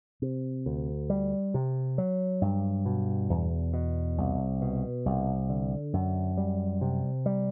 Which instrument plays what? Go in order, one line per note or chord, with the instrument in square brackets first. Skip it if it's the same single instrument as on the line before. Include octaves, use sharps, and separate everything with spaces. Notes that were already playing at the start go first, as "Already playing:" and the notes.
[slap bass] C3
D2
G3
C3
F#3
G2
B2
E2
B2
C2
B2
C2
D3
F#2
G3
C3
G3